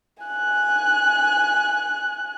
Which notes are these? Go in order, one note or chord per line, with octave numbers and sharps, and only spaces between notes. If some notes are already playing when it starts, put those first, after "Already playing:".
G#5 F#6